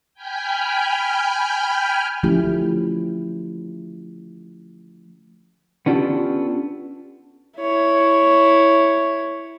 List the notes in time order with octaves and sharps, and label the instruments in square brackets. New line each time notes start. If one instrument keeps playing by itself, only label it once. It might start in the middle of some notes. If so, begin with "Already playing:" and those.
[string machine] G5 G#5 B5 F6 G6
[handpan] D3 F3 A3 C#4 E4 G4
[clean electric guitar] B3 C#4 D4 F4 G4 A4
[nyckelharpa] E4 C#5